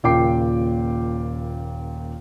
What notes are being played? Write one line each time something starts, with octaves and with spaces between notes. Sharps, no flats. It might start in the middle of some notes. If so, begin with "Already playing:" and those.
D#1 A#2 C#3 G5 D6 C7